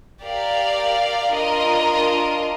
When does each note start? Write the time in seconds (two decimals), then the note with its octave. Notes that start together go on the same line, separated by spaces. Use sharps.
0.22 G4 A#4 D5 F5
1.34 D4 F4 A#4 D#5